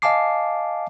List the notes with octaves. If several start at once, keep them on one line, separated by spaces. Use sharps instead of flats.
D#5 F5 G#5 A5 D6 C7